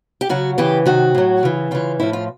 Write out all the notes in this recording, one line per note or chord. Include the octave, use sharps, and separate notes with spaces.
G4
C#3 F#3 F#4
C#3 E3 G4
C3 D#3 F#3 F#4
A2 F#3
C#3 E3
C#3 E3 F4
A2 F3 E4
F4